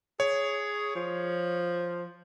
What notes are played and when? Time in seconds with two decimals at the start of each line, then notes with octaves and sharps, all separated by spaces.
0.20 G#4 C#5
0.95 F3